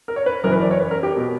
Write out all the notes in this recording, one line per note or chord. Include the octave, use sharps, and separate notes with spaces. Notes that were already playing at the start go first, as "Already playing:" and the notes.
A#4
C#5
B4
F#1 F#2 E3 A#4
B4
D5
C#5
B4
A#4
G4
B2